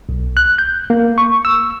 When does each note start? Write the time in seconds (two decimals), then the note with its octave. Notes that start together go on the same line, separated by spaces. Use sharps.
0.09 B1
0.37 F#6
0.58 G6
0.90 A#3
1.18 C#6
1.45 E6